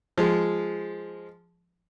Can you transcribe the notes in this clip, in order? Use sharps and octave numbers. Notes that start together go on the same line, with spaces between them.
F3 G#3